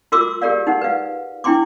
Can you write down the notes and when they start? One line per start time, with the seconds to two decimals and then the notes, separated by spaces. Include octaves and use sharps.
0.12 F4 F#4 A#4 C6 D6 E6
0.42 G4 G#4 A#4 D5 F5
0.67 D#4 F#5
0.81 B4 F5
1.44 D4 E4 G5 C6 D6